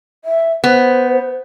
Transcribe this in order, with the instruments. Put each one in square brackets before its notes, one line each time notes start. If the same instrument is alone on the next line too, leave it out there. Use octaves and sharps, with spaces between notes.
[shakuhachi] E5
[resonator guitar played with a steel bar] B3 [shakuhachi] C5